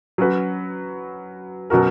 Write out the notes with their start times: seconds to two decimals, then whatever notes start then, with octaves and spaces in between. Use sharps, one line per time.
0.18 F#3 C#4 F#4 B4
1.70 B2 F#3 C#4 F#4 A#4